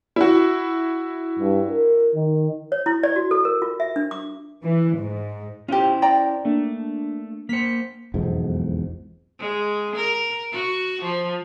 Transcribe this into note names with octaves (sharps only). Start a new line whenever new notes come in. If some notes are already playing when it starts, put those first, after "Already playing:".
E4 F#4
G2
A#4
D#3
C#5
E4
D5
F#4
A4
A#4
F4
E5
D4
D6
E3
G#2
C#4 E4 F4 G4 C5
D5 G5 A#5
A3 A#3 D4
A#3 C5 B6 C#7
E1 B1 F2 G#2
G#3
A#4
F#4
F3